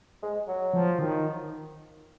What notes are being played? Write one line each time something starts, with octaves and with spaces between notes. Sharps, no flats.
G#3
F#3
F3
D#3